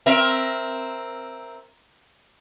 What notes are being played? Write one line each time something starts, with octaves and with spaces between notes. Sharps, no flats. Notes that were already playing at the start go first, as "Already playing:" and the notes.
C4 A#4 E5